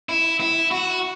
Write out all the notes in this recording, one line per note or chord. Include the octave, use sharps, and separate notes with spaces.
E4
E4
F#4